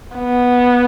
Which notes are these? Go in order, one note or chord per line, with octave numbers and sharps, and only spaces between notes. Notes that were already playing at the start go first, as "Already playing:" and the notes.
B3